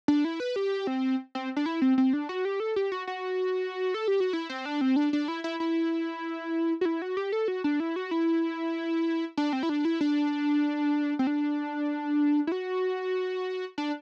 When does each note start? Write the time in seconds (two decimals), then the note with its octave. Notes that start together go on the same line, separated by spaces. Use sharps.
0.08 D4
0.25 E4
0.40 B4
0.56 G4
0.87 C4
1.35 C4
1.56 D4
1.66 E4
1.82 C4
1.98 C4
2.13 D4
2.29 F#4
2.45 G4
2.60 A4
2.76 G4
2.92 F#4
3.07 F#4
3.94 A4
4.08 G4
4.20 F#4
4.33 E4
4.49 C4
4.65 D4
4.81 C4
4.96 D4
5.13 D4
5.28 E4
5.44 E4
5.60 E4
6.81 F#4
6.85 E4
7.02 F#4
7.17 G4
7.32 A4
7.48 F#4
7.64 D4
7.80 E4
7.96 F#4
8.11 E4
9.37 D4
9.53 C4
9.63 E4
9.69 D4
9.85 E4
10.01 D4
11.19 C4
11.27 D4
12.47 E4
12.52 F#4
13.78 D4